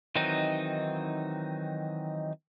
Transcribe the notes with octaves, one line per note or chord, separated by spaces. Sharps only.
D#3 E3 F#3 C4 D#4